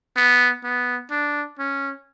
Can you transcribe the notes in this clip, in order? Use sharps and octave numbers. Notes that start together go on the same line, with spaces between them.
B3
B3
D4
C#4